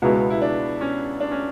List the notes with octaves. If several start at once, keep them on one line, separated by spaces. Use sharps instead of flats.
C#2 B2 G#3 B3 E4 F#4
E4
D4
C#4
D4
C#4